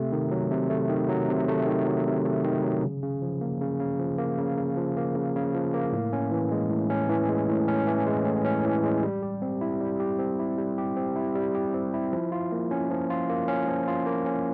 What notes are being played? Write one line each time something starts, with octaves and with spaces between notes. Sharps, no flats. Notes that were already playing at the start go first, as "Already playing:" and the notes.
Already playing: C3 A3
D#3
F#3
C3
A3
D#3
F#3
C3
A3
D#3
F#3
C3
A3
D#3
F#3
C#3
C#3
F3
A#3
C#3
C#3
F3
A#3
C#3
C#3
F3
A#3
C#3
C#3
F3
A#3
A2
C#4
E3
G#3
A2
C#4
E3
G#3
A2
C#4
E3
G#3
A2
C#4
E3
G#3
G3
G4
C4
E4
G3
G4
C4
E4
G3
G4
C4
E4
G3
G4
C4
E4
F3
F4
A#3
C#4
F3
F4
A#3
C#4
F3
F4
A#3
C#4